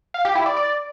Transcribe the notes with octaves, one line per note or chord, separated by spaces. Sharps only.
F5
G4
E4
D5
D5